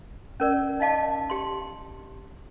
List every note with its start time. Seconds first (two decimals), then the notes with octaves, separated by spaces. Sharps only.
0.40 C#4 A#4 D5
0.80 D#4 D#5 F5 A5 D6
1.30 G4 C6